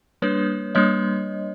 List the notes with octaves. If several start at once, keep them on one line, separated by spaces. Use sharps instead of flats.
G3 A#3 D4 B4 C#5
G3 A#3 D4 C#5 D#5